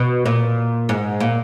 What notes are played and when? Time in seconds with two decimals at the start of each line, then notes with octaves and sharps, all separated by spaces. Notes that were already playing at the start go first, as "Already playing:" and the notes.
Already playing: B2
0.26 A#2
0.89 G#2
1.20 A#2